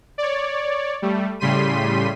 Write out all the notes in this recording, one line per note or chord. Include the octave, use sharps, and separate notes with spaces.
C#5 D5
G3 A3
A2 C#3 G3 C6 B6 D#7